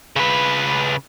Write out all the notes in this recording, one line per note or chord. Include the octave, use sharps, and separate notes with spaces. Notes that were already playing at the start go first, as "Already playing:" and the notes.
C#3 B4